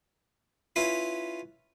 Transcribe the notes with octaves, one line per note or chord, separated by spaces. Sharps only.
C#4 E4 F4 B4